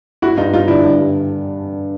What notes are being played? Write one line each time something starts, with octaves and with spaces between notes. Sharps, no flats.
G2 E4 F#4
G2 D#4 F4
G3 D#4 F4
D3 D4 E4
G2
G3